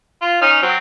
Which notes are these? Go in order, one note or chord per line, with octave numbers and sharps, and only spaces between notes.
F4
C#4 D#4 F6
F#3 C4